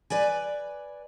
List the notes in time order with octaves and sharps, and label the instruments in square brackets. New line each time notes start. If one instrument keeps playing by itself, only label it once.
[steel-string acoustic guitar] B4 D5 G#5